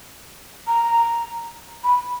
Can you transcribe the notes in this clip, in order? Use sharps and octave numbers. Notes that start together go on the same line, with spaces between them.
A#5
B5